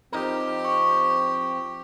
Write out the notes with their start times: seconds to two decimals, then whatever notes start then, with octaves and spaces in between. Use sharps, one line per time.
0.12 F3 C4 D#4 G4 A#4
0.65 C#6